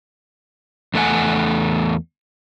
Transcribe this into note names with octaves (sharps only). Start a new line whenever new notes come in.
E2 A3 B3 F#5 G#5